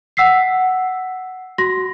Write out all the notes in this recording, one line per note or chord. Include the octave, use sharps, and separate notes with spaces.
F#5 E6 B6 C7
F#4 C6 A#6